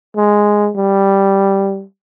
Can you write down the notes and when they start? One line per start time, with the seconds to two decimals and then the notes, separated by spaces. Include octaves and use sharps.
0.17 G#3
0.76 G3